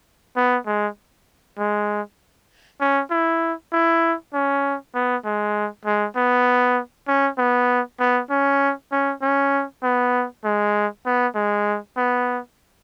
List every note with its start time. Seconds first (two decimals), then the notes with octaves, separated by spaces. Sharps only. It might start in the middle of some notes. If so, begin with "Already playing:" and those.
0.36 B3
0.67 G#3
1.59 G#3
2.81 C#4
3.11 E4
3.73 E4
4.34 C#4
4.95 B3
5.25 G#3
5.85 G#3
6.16 B3
7.08 C#4
7.38 B3
8.00 B3
8.30 C#4
8.92 C#4
9.22 C#4
9.83 B3
10.44 G#3
11.06 B3
11.35 G#3
11.97 B3